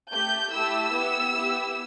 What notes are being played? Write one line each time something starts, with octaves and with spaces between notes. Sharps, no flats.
A3 G4 G6
A3 E4 G4 E6
B3 E4 G4
B3 E4 G4